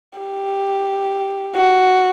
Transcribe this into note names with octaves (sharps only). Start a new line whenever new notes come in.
G4
F#4